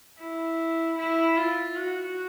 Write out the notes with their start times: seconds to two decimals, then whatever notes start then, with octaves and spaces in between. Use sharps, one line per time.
0.19 E4
0.97 E4
1.37 F4
1.77 F#4